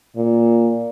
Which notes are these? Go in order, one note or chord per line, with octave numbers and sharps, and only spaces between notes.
A#2